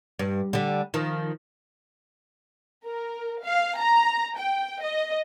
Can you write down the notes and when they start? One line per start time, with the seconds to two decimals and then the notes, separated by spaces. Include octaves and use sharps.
0.19 G2
0.53 D3 G3
0.94 D#3 F3
2.85 A#4
3.43 F5
3.80 A#5
4.38 G5
4.83 D#5